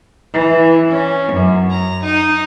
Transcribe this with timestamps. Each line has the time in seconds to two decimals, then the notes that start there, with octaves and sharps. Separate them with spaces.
0.34 E3
0.90 C#4
1.32 F#2
1.69 A#5
2.03 D#4